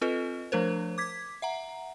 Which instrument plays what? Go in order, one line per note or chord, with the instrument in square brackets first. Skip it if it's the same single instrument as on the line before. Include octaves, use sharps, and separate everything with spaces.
[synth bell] C4 F4 A4 B4 D#5
F3 A3 D4 A#4 C5
D6 G#6 B6
E5 F#5 A#5